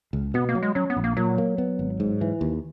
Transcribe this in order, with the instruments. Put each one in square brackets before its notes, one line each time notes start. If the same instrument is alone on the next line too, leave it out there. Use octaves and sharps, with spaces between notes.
[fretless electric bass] C#2
[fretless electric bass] B2 [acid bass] B3
[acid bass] A#3
[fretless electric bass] F#3
[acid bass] G#3
[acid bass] F#3 [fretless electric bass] C#4
[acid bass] B3
[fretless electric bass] A#1
[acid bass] A#3
[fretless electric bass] A#2 [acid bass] F#3
[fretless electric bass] A#3
B3
G#1
G#2
E3
D#2